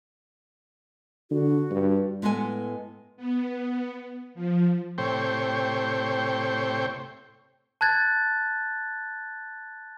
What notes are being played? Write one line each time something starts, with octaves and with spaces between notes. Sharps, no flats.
D3 F#4
G2
A2 G#3 B3 A4 G#5
B3
F3
A2 C3 C5 C#5 G5
A5 F#6 G#6 A6